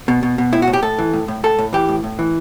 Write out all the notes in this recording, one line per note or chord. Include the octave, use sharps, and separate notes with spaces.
B2
B2
B2
A2 E4
F#4
A2
G4
A2 A4
E3
A2
A2
A2 A4
A2
E3 G4
A2
A2
E3